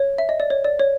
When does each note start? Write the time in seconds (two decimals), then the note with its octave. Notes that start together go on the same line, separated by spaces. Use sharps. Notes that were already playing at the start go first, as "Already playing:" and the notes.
Already playing: C#5
0.18 E5
0.29 D#5
0.40 D5
0.50 C#5
0.64 D5
0.79 C#5